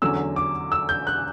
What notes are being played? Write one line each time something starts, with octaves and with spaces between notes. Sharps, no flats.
E2 D3 F#3 C#4 E6
D6
E6
G6
F#6